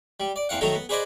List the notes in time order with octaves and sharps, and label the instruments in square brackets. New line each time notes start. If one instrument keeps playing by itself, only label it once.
[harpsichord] G3
D5
E2 C4 F5 F#5
D#3 F#3 A3 D#4 A4 A#5
B3
G#4 B4 C5 D5 D#5 G#5